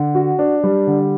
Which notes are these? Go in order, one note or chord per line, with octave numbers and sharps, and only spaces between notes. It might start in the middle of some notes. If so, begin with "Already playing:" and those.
Already playing: D3
F#4
D4
G3
D3